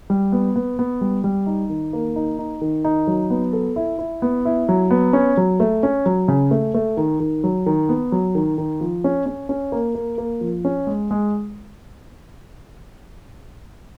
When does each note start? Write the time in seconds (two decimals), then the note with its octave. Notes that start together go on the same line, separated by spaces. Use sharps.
0.10 G3
0.32 B3
0.56 B3
0.79 B3
1.01 G3
1.24 G3
1.46 D#4
1.70 D#3
1.93 A#3
2.16 D#4
2.39 D#4
2.61 D#3
2.84 D#4
3.07 F#3
3.30 B3
3.53 A4
3.76 E4
3.99 E4
4.22 B3
4.45 E4
4.69 F#3
4.91 B3
5.13 C#4
5.37 F#3
5.60 A3
5.83 C#4
6.06 F#3
6.28 C#3
6.51 A3
6.74 A3
6.97 D#3
7.20 D#3
7.44 F#3
7.66 D#3
7.89 B3
8.12 F#3
8.35 D#3
8.58 D#3
8.81 F3
9.04 C#4
9.26 C#4
9.49 C#4
9.72 A#3
9.95 A#3
10.18 A#3
10.41 F3
10.65 C#4
10.87 G#3
11.11 G#3